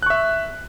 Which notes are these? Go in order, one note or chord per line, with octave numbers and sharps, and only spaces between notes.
E5 C#6 F#6